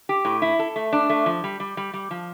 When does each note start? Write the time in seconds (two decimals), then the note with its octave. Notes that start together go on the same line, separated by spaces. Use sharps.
0.09 G4
0.25 A2
0.42 E4
0.59 A4
0.76 A3
0.93 D4
1.10 A3
1.26 F3
1.44 G3
1.60 G3
1.77 G3
1.93 G3
2.11 F3